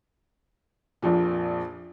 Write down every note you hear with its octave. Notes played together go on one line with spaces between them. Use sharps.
A#1 F2 A#2